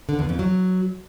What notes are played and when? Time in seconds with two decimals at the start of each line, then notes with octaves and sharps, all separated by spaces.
0.09 D3
0.19 E2
0.29 F2
0.39 F#3